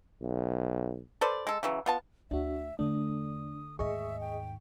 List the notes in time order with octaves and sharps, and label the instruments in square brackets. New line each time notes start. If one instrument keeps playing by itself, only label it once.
[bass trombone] B1
[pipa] A4 B4 C5 D5
G#3 A4
C#3 E3 F#3
B3 F4 A5
[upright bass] D2 [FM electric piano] D4 F#4 [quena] E5
[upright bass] E2 [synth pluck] D3 A3 [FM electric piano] D4 [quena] D#6
[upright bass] D#2 G#2 [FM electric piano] G#4 D#5 [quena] E5 [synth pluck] C#6
[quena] G5